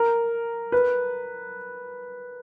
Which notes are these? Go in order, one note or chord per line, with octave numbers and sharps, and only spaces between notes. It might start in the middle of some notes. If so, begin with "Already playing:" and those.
Already playing: A#4
B4